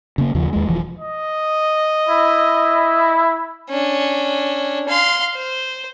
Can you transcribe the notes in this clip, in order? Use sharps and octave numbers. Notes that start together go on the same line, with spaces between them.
C#3 A#3
D#2 C#3 F3
D#2 G#3
E1 E3 F3
D#5
E4
C#4 D4
F5 C6
C5